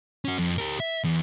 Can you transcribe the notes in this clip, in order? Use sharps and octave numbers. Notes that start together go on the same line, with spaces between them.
C#4 F#4
F2
G4 A#4
E5
E2